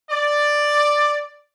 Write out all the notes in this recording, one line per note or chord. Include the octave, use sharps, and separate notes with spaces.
D5